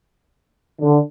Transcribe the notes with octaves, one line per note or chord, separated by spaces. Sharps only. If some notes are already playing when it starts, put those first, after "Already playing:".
D3